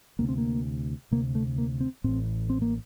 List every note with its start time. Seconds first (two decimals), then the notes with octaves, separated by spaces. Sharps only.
0.19 D2 C3 A#3
0.29 C4
0.38 A#3
1.11 D2 C3 A#3
1.35 A3
1.58 A#3
1.80 C4
2.04 A1 A2 C4
2.50 C4
2.62 A#3